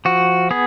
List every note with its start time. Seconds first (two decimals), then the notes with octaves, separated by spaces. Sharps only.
0.05 F3 F#4
0.51 B3 G#4